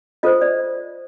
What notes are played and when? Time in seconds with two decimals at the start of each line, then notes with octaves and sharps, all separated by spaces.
0.23 F4 A4 C5 D#5
0.41 D5